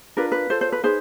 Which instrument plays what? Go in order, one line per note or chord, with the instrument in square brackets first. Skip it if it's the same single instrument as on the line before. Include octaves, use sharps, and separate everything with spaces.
[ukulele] D4 F4 A#4 B4
B4
F4 A4 C5
C5
B4
D#4 G#4 B4 C5